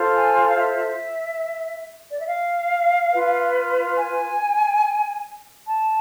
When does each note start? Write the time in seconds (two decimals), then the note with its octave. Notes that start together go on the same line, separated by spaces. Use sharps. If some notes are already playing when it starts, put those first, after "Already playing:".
Already playing: F4 A4 C5
0.16 G#5
0.48 F5
0.58 E5
2.11 D5
2.20 E5
2.28 F5
3.12 F4 B4
3.98 G#5
5.67 A5